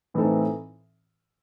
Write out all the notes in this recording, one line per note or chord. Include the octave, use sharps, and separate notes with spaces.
A2 E3 C4 D#4 A4